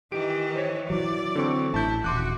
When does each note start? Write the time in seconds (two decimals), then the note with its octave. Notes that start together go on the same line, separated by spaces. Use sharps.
0.12 D#3 E3 G4 D7
0.56 C5 C#5
0.90 E3 F#3 D5
1.35 D3 C4 C#6
1.74 A1 E4 A5 G6
2.04 D#1 F#4 C6 D6 F#6